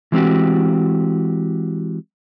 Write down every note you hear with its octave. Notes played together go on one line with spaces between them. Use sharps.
E3 G#3 C4 F#4 G4